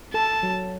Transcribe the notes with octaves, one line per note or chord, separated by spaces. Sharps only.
A4 A5
F#3